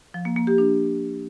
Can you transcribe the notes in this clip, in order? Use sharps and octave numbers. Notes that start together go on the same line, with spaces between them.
F3
A#3
A#3
G4
D4